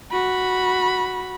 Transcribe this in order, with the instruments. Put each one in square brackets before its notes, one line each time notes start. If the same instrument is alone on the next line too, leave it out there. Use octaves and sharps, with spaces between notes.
[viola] F#4 B5